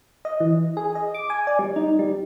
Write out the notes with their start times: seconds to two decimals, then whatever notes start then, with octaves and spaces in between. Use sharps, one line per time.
0.25 D#5
0.40 E3
0.77 G#4
0.95 D#5
1.14 D6
1.30 G#5
1.47 D5
1.59 G3
1.76 D#4
1.99 G3